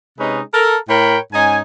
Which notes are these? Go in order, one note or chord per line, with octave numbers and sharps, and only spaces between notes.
C3 G#3 C#4 D#4 B4
A4 A#4
A2 A#4 C#5 G5 B5
G#2 C#4 D#4 G#5